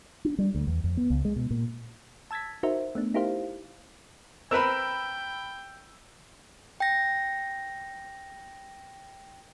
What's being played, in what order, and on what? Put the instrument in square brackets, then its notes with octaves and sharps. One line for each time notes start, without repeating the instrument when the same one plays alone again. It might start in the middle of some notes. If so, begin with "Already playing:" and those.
[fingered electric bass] D4
G3
D2
E2
F2
B3
C#2
G#3
B2
A#2
[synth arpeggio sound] A5 E6 G#6 A6 B6
D#4 F#4 A#4 C5 E5
A3 B3 D4
D#4 E4 G4 A#4 C5 F5
[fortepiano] C4 A#4 B4 [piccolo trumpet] G5 [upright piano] B5 E6
[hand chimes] G5 A#6